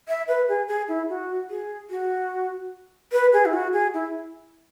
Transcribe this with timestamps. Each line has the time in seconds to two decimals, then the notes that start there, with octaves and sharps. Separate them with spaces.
0.08 E5
0.28 B4
0.48 G#4
0.68 G#4
0.88 E4
1.09 F#4
1.50 G#4
1.90 F#4
3.12 B4
3.33 G#4
3.46 E4
3.53 F#4
3.73 G#4
3.94 E4